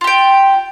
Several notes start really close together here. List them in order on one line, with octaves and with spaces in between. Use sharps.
F4 G4 G5